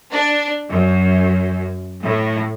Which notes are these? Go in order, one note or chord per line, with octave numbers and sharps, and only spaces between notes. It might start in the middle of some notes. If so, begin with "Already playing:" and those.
D4
F#2
A2